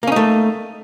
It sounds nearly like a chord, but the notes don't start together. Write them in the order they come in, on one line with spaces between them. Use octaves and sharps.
A#3 C#4 D#4 A3